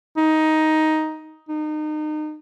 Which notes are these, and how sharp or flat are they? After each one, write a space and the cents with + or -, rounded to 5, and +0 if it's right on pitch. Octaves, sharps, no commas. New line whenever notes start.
D#4 +10
D#4 -30